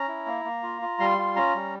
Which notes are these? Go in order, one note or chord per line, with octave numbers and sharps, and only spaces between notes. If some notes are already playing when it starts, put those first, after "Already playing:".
Already playing: C#4 A#5
E4
A#3
A#3
F4
F4
G3 C6
F4
C#4 A#5
G3